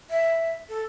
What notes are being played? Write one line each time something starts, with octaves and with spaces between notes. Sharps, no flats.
E5
A4